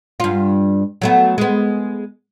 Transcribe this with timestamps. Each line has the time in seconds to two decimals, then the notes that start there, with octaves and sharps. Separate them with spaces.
0.20 G2 F4
1.02 F#3 A3 B3
1.38 G#3 B3